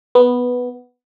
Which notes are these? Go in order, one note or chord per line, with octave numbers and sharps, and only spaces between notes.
B3